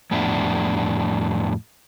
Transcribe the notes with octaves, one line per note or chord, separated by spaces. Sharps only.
F2 A2 B3 D4 E5